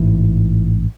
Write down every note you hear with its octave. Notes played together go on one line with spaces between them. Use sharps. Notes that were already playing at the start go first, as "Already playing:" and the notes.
Already playing: A1 G#2 E3